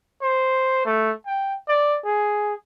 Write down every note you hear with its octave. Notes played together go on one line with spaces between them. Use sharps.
C5
A3
G5
D5
G#4